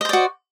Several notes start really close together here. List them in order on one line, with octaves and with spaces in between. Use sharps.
D#5 C5 D5 F#4